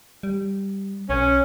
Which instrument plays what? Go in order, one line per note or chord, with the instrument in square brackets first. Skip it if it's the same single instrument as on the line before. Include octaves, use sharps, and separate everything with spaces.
[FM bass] G3
[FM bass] B1 [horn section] C#4